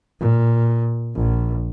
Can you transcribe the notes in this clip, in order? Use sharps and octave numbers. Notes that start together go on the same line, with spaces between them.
A#2
A#1